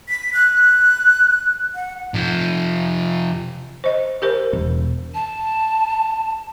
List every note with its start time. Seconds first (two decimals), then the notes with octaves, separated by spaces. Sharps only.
0.09 B6
0.34 F#6
1.75 F#5
2.14 C3 F3
3.84 C5 D#5
4.22 G4 A#4 C5
4.53 E1
5.14 A5